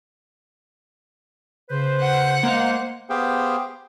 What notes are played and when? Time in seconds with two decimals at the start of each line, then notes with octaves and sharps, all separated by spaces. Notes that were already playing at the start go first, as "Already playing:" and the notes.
1.70 C#3 B4 C5
2.01 F#5
2.43 G#3 A#3 C5 F5
3.10 B3 G4 G#4 C5 F5 G5